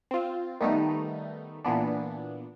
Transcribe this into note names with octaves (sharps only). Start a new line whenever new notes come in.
C4 F4
D#3 G3 A3 B3 D#4
A#2 E3 B3 D4